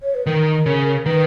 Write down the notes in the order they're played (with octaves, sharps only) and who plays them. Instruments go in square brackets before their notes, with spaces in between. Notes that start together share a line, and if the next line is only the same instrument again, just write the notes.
[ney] C#5
B4
[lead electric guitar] D#3 [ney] A#4
[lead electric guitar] C#3
[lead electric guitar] D#3 [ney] B4